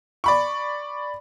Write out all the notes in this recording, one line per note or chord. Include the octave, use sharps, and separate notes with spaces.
D5 B5 C#6